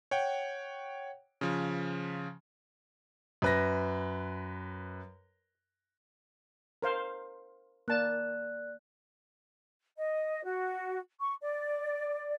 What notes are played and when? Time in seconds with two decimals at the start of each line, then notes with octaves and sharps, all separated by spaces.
0.11 C#5 F#5 G5
1.41 C#3 F3
3.42 F#2 B4 A#6
6.82 A#4 C5 F5
7.88 A#3 D5 A5 F#6
9.98 D#5
10.44 F#4
11.20 C#6
11.41 D5